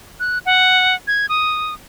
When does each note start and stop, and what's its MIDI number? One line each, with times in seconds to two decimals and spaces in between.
0.20 0.39 90
0.46 0.95 78
1.07 1.26 92
1.29 1.74 87